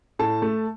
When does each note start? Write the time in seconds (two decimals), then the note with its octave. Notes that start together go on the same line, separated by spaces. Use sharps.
0.19 A2 A5
0.42 A3